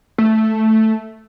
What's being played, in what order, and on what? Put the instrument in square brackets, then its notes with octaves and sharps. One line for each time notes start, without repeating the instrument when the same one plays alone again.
[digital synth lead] A3